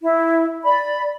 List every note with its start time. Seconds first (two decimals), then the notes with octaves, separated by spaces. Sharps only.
0.02 E4
0.64 D5 B5